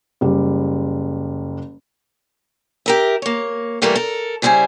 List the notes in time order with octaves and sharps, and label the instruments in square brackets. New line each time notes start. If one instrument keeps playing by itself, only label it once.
[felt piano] F#1 G3
[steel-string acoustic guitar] G4 A#4 E5
A#3 C#5
E3 G3 A3 A#3 A4 A#4
A4 A#4
C#3 G3 E4 C5 G#5